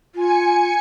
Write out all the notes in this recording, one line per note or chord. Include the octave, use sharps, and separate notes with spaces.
F4 G#5 C#7